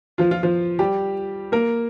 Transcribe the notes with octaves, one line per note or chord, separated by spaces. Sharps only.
F3 F4
F3 F4
F3 F4
G3 G4
A#3 A#4